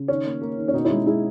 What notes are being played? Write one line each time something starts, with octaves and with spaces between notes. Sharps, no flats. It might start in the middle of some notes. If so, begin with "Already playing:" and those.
Already playing: C#3
D#3 C#4
A#3
A#3
D#3
C#4
B2 D#4
C#4 E4
G#3
G#3 E4 G#4